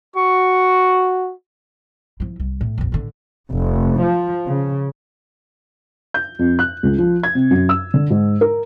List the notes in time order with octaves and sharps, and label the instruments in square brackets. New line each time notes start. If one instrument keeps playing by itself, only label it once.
[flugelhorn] F#4 [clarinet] C#6
[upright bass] F3 E4
C2
A2
A#1 F2
A1 D3
[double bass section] F1
F3
C#3
[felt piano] G6
F2
F#6
C#2
F3
G#6
C3
F#2
E6
D3
G#2
A#4